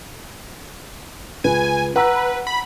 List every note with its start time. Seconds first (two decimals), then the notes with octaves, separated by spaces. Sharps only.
1.44 C#2 B4 G#5
1.96 B4 F#5 A#5 E6
2.47 B5